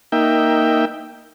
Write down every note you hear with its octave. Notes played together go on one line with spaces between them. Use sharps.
A#3 D#4 E5 G5